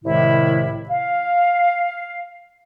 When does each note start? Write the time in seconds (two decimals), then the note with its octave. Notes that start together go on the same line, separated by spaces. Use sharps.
0.04 C2 A2 C3 D#3 G#3 E4
0.89 F5